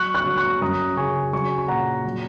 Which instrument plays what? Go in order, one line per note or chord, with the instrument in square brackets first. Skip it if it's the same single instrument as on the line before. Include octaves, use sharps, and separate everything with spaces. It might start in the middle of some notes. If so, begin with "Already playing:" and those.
Already playing: [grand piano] F#3 C#6 F#6
C#6 F#6
F#3
C#6 F#6
F#2 A#5 D#6
C#3 G#5 C#6
F#3 G#5 C#6
C#6
A#2 F#5 A#5
F#3